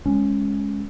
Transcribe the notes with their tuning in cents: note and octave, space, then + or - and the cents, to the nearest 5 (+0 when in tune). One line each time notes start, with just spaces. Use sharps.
G#3 +0 C#4 +0